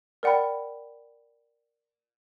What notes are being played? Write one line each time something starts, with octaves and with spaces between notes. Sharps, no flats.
A#4 D5 F#5 G5 B5